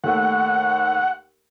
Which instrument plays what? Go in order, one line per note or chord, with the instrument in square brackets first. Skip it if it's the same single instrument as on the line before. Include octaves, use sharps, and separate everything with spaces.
[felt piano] D#2 A3 [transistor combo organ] F#5